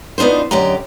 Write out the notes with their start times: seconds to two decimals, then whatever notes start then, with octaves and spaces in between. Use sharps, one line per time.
0.18 B3 D4 D#4 F4 C5
0.51 F#2 D3 G4 D#5 A#5